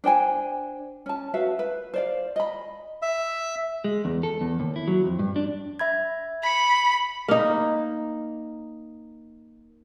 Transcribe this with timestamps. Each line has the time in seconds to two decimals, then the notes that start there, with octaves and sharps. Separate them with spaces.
0.04 D4 C5 G5 G#5
1.06 C#4 A5
1.34 F#4 B4 E5 F5
1.59 B4
1.94 C5 D5 F5
2.36 D#5 B5
3.02 E5
3.84 G#3
4.05 E2
4.23 A4
4.41 E2
4.60 D#2
4.76 E4
4.88 F#3
5.04 F2
5.19 G2
5.36 D4
5.79 E5 B5 G#6
6.43 B5 B6 C#7
7.28 A#3 D#4